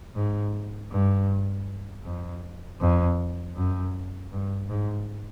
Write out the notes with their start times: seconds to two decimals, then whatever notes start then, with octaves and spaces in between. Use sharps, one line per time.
0.15 G#2
0.91 G2
2.05 F2
2.81 F2
3.56 F#2
4.32 G2
4.70 G#2